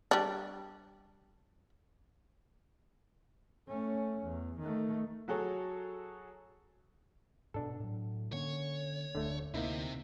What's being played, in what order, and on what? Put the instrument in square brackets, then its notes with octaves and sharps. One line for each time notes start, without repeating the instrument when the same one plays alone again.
[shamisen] G3 D4
[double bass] A3 C#4
E2
D#3 A3
[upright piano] F#3 F#4 G#4 A4 C#5
[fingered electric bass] G#2 B2 [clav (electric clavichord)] D4 A4
[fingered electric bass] A2 F#3
[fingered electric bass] D3 A#3 C#4 [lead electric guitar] C#5
[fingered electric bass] D1 D2 [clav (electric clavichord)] D3 A3
[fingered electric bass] D2 [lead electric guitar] C3 [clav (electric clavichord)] A#3 D#4 E4